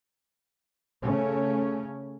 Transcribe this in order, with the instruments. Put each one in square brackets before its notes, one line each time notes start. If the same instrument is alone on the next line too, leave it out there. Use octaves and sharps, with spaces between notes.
[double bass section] C#3 A3 C#4